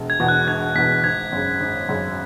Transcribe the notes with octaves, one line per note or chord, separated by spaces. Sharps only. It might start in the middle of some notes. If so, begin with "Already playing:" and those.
Already playing: E1
G#6
E2 B2 B3
F#6
E1 G#6
E2 B2 B3 B6
G#1 G#6
F#2 C#3
G#1
F#2 C#3